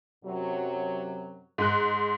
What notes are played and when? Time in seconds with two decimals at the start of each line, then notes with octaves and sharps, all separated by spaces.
0.25 F#2 C3 F#3
1.58 G#2 F#6